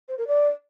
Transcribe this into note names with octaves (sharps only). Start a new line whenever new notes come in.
C5
A#4
D5